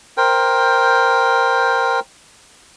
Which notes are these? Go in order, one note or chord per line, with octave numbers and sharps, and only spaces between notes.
A#4 C5 G5